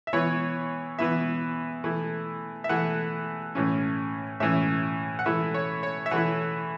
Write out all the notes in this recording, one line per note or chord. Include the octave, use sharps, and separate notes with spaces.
E5
E3 B3 E4 C#5
E3 B3 E4 E5
E3 A3 E4
E5
E3 A3 E4 F#5
A2 E3 C#4
A2 E3 C#4 E5
F#5
E3 A3 E4 E5
C#5
C#5
E5
E3 A3 E4 F#5